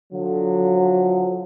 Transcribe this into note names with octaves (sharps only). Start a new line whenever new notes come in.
D3 F3 F#3